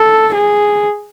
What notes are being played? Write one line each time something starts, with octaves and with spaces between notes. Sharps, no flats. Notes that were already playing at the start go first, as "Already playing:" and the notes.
Already playing: A4
G#4